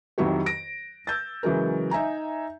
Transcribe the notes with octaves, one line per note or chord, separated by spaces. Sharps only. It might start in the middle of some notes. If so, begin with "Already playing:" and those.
F2 D#3 F#3 E4 F#4 G4
A#6 D7
E6 G6 A6
C#3 E3 F#3 G#3 A#4
D#4 E5 G#5 A#5